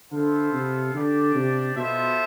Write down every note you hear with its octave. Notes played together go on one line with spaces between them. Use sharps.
D3 B3 E4 A4 C5 F5
C3
D3 D4 G4 D5
C3
B2 B3 F4 A4 C5 E5